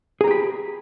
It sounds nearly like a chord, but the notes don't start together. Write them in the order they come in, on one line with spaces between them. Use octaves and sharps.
G#4 A#5 G4 B5